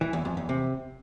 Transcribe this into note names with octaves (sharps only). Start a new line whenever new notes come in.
E3
E2
F2
E2
C3